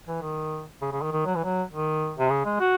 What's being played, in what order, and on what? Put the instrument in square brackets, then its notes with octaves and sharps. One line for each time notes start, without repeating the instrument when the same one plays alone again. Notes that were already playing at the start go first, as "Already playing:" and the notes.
[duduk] E3
D#3
C#3
C#3
D#3
D#3
F#3
E3
F#3
D#3
C3
C#3
G#3
F#4